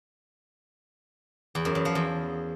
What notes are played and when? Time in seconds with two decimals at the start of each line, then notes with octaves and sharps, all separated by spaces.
1.55 E2
1.65 F#2
1.75 E2
1.85 F3
1.95 E2